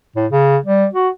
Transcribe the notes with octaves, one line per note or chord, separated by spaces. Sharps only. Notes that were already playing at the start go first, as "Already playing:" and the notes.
A2
C#3
G3
F#4